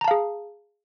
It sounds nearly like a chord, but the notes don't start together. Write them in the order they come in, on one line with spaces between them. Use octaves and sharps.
A#5 A5 F5 G#4